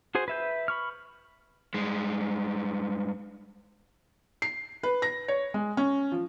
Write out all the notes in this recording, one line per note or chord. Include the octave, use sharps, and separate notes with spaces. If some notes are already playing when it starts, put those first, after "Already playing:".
F#4 G#4 C5 G#5
B4 E5 G6
B5 C#6 F6
G2 G#3
C7
B4
A#6
C#5
G#3
C#4
F3